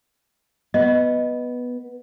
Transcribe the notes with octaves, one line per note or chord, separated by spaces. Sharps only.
B3 D#5